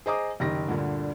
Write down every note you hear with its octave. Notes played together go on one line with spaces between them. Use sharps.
G#4 C5 D#5 A#5 D6 D#6
F#1 D#3 G4 A#6
D2 G2 A#2 D3